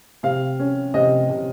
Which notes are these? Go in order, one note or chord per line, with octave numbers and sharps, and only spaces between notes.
C3 F5
C#4
C3 D#5
C3